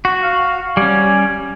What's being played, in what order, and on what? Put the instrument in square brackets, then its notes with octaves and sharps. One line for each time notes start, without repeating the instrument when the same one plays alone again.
[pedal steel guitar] F#4
[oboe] F5
[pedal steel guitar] G3 C#4 [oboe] G#5